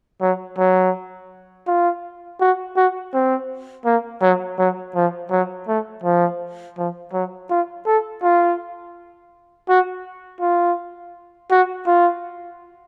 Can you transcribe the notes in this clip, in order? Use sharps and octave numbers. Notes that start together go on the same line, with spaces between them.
F#3
F#3
F4
F#4
F#4
C4
A#3
F#3
F#3
F3
F#3
A3
F3
F3
F#3
F4
A4
F4
F#4
F4
F#4
F4